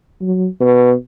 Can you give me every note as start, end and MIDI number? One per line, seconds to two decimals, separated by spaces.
0.21 0.47 54
0.60 0.93 47